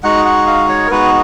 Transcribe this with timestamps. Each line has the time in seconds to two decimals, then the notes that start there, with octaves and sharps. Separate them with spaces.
0.03 G#3 D#4 F#4 F#5
0.25 F#5
0.47 F5
0.69 C#5
0.86 A#4
0.91 G#3 B3 D#4 F#4 B4